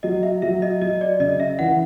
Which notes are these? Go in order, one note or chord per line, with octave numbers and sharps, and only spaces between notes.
F#3 D#5
E5
F#3 E5
D#5
F#3 D#5
D5
C#3 D#5
E5
E3 F#5